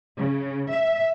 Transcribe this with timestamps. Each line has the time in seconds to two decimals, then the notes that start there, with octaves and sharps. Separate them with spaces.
0.18 C#3
0.70 E5